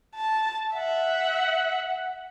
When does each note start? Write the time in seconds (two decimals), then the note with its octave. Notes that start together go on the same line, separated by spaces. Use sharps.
0.15 A5
0.74 E5 F#5